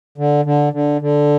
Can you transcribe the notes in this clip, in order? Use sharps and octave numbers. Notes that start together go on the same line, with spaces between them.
D3
D3
D3
D3